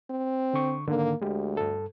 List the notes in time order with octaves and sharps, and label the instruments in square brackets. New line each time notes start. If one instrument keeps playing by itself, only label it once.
[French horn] C4
[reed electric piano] D3 C#6
[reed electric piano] G#2 D3 D#3 [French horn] A#3
[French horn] D2 [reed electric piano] G#3 G4
[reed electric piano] G2 A4